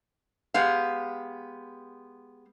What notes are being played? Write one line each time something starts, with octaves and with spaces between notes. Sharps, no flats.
G#3 B3 G4 F5